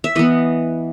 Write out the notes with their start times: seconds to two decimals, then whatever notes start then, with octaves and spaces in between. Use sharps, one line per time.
0.04 E5
0.15 E3 B3 D#5